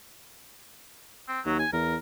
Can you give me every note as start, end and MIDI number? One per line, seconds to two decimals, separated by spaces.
1.28 1.40 60
1.45 1.64 39
1.45 1.56 54
1.59 1.71 80
1.73 1.96 40
1.73 1.96 70